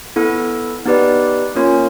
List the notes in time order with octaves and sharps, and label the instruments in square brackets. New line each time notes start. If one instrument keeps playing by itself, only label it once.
[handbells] B3 E4 A4
B3 D#4 G4 B4 D5
A#3 C#4 F4 A#4 C#5